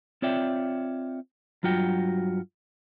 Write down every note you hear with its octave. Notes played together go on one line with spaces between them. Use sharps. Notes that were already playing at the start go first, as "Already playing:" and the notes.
C4 F4 C#5 D5 E5 G5
G2 F#3 F4 F#4 G5